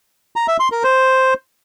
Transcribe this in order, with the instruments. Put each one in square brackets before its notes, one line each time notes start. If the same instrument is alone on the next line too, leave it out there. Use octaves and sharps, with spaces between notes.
[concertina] A#5
E5
C6
A#4
C5